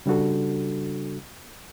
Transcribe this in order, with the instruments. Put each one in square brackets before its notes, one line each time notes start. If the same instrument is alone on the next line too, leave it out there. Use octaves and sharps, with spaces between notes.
[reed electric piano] C#3 G3 D4 F#4 A4